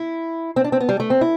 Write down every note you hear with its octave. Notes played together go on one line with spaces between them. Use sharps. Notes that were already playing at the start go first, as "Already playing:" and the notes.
Already playing: E4
C4
D4
C4
B3
G3
A3
C4
E4